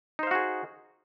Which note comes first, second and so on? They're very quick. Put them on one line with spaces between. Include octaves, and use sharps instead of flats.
D#4 C5 F5 F#4 G#4